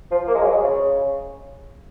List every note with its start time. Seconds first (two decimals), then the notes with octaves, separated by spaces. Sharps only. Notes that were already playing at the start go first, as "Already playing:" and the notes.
0.11 F3
0.27 A#3
0.35 G#3
0.42 F#3
0.50 G#3
0.63 C#3